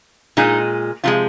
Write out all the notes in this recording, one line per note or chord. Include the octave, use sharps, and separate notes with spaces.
A#2 G#3 D#4
C3 F3 G#3 F4